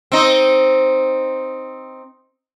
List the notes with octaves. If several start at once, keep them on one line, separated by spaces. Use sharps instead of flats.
C4 D#4